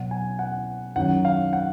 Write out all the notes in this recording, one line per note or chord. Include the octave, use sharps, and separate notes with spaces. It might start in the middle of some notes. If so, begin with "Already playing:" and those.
Already playing: B2 F#3 F#5
G#5
F#5
F#2 D#3 F#3 F#5
F5
F#5